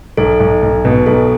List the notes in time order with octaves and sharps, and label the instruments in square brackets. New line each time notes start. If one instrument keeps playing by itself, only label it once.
[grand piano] B1 [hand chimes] A4
[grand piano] B1
B1
[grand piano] B2 [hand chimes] B4
[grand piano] B1 [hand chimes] A4